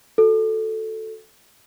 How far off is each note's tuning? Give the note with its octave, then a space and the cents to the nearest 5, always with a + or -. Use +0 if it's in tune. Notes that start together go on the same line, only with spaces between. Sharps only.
F#4 -20 A4 +0